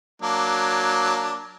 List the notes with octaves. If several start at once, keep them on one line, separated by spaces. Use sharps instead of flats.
F#3 A#3 D4